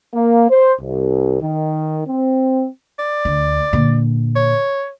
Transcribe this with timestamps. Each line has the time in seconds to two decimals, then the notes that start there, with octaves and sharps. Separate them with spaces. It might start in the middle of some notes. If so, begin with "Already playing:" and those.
0.14 A#3
0.50 C5
0.81 C2
1.42 D#3
2.08 C4
2.99 D5
3.25 D2
3.73 A#2 D3
4.36 C#5